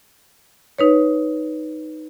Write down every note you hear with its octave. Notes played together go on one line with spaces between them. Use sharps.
D#4 B4 C#5